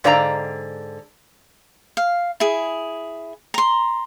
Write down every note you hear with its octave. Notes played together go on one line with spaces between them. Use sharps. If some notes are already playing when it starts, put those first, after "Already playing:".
G#2 D3 D5 F5 G5 A#5
F5
E4 G#4
A#5 C6